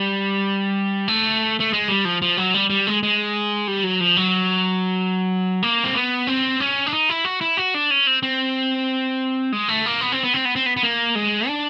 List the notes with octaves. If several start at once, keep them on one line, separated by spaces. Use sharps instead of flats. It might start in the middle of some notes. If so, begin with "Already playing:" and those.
Already playing: G3
A3
A3
G#3
G3
F3
F3
F#3
G3
G3
G#3
G#3
G3
F#3
F3
F#3
A#3
C4
B3
C4
C#4
D4
D#4
E4
F#4
E4
F#4
D4
C#4
C4
C4
G#3
A3
A#3
B3
C4
B3
C4
B3
C4
B3
B3
A#3
G#3
D4